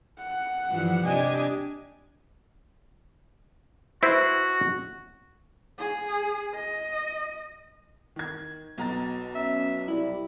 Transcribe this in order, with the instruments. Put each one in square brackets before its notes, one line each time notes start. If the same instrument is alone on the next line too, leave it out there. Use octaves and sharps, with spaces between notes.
[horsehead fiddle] F#5
[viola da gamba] G2 E3 F3
[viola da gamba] C3 D4 G4 [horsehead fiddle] D#5 G#5
[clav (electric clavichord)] E4 B4 C5 [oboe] F#4
[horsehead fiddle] G#4
D#5
[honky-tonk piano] D#3 G#6
[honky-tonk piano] B1 A#5 A6 [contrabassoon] B2
[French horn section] C#4 [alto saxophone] E5
[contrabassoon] C2 [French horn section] G3 [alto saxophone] E4